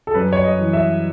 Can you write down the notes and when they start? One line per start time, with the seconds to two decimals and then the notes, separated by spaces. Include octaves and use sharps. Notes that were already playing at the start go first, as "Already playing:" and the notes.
0.07 A4
0.15 F#2 B4
0.33 C#5
0.44 D#5
0.58 E3
0.73 E5